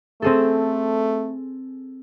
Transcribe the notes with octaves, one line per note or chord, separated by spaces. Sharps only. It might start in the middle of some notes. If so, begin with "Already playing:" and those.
A3 C4 G#4 A4